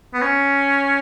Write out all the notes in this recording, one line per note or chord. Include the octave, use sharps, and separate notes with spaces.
B3
C#4